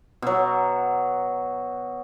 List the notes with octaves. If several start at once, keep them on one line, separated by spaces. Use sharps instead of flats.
B2 F#3